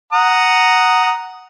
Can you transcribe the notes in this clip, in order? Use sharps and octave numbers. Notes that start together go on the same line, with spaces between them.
F#5 A#5 D#6